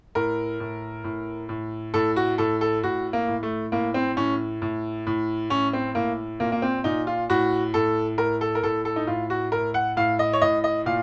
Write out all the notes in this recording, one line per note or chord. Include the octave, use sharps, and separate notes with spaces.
A2 A#4
A2
A2
A2
A2 A4
F#4
A2 A4
A4
A2 F#4
A#3
A2
A3
A2 A#3
C4
A2 C#4
A2
A2
A2 C#4
C4
A2 A#3
A#2 A#3
A#3
C4
A#2 D#4
F4
A2 F#4
A2 A4
A2 A#4
A4
A#4
A2 A4
A4
D#4
A2 F4
F#4
A2 A#4
F#5
A2 F5
D#5
C#5
A2 D#5
D#5
A#2 F5